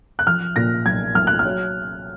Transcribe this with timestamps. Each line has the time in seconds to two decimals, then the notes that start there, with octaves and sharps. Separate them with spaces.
0.19 F#6
0.27 F3 F6
0.56 A#2 A#6
0.86 B1 G#6
1.15 B1 F6
1.27 F#6
1.39 F6
1.45 F#3